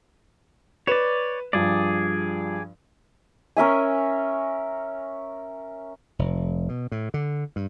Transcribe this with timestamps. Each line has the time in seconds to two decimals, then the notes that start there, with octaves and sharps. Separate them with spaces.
0.87 B4 C#5 D5 E7
1.53 G2 F3 G#4 D5
3.57 C#4 A#4 E5 G#5
6.19 F1
6.69 B2
6.92 A2
7.14 D3
7.56 G2